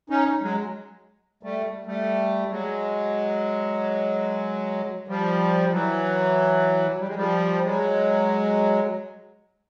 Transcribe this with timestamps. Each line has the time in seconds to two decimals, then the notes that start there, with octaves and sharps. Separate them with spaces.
0.10 C#4 D#4
0.42 F#3 G#3
1.43 G3 A3
1.86 G3 A3
2.50 F#3 G#3
5.07 F3 G3
5.71 E3 F#3
7.00 G3
7.07 G#3
7.15 F3 G3
7.64 F#3 G#3